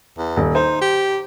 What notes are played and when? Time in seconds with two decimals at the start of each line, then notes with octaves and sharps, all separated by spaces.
0.17 E2
0.37 D#1
0.55 D#4 C5
0.81 G4